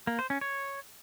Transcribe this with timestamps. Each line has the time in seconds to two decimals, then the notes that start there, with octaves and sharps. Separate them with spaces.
0.07 A#3
0.19 C5
0.30 C#4
0.41 C#5